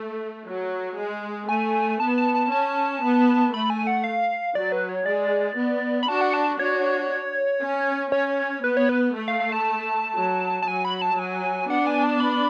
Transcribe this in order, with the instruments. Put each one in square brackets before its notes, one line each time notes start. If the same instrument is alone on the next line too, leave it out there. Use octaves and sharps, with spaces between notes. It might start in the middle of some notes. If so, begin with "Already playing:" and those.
Already playing: [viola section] A3
F#3
G#3
[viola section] A3 [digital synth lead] G#5
[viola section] B3 [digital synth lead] A5
[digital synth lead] A5
A5
[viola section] C#4 [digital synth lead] A5
[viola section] B3
[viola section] A3 [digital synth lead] B5
[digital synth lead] G#5
F#5
F5
[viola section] F#3 [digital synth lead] D5
[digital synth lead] B4
C#5
[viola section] G#3 [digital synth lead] D5
[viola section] B3
[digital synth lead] B5
[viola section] D4 F#4 [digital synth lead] A5
[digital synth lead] F#5
A5
[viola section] D4 F#4 [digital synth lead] C#5
[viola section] C#4
[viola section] C#4 [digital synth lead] C#5
[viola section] B3 [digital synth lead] B4
[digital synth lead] C#5
B4
[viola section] A3
[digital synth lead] F5
F5
A5
[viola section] F#3
[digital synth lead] A5
[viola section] F#3 [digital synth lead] G#5
[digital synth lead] B5
A5
[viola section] F#3 [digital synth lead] G#5
[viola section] B3 D4 [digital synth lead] F#5
[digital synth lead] G#5
A5
B5